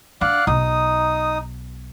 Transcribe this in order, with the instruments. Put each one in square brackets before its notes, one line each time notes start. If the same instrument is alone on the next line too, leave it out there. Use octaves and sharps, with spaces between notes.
[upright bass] D4 [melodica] D5 F5 F#5
[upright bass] B1 [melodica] D#4 D#6